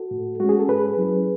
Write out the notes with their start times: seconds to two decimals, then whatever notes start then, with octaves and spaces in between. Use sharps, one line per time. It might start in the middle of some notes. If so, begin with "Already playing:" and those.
Already playing: F#4 A4
0.11 A2
0.40 G#3 C#4 F#4
0.49 G#4
0.59 A4
0.68 G#2 G#4 B4
0.97 F#3 C#4 E4